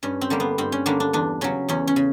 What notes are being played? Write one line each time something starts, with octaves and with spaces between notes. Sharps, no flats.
G2 C#4
C4
D3 G3 A#3
B3
G2 C4
C#4
D3 G3 A#3 D4
D4
E2 D4
C#3 F#3 C#4
E2 C#4
C#4
C#3